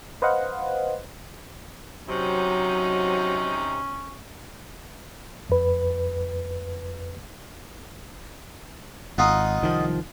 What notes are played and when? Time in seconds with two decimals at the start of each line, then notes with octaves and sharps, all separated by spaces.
0.22 B4 C5 D#5 F5 F#5
2.09 C3 F#3 C#4 D#4
5.50 F2 B4
9.18 G#1 D#4 F4 F#5
9.61 C2 D#3 F3